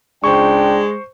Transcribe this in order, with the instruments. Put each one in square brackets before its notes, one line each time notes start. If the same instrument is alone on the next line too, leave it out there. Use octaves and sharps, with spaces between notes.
[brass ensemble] C#2 G5 [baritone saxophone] G#3 [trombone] D4 [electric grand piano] C5 C#6